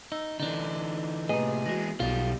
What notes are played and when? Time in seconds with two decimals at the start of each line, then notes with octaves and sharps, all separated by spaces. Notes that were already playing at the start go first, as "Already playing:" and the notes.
0.12 D#4 E6
0.40 D3 E3 D4 D#4
1.29 A2 C3 A#3 G#4 B4 D#5
1.66 E3 G#3 F#4 A#6
2.00 B1 B2 G3 F4